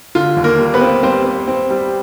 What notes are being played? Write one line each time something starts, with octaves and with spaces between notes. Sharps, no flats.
D3 F4
D#2
A#3 A#4
G3
B3 B4
C4
G3 C4 C5
C4
C4
G3